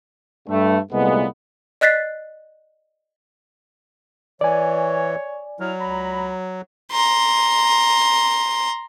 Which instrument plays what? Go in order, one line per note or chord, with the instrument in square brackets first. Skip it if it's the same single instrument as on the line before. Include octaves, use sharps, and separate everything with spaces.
[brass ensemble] G2 A3
C2 A#2 G#3 A3 B3
[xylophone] D5 D#5 F#6 A6 B6 C7
[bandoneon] E3 [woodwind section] C#5 [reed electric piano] D5 G#5
[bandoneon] F#3 [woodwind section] E4 F6
[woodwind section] C#2 A#5 B5
[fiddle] A#5 C6